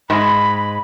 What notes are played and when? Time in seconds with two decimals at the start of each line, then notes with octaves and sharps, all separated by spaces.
0.10 G#2 G#3 B5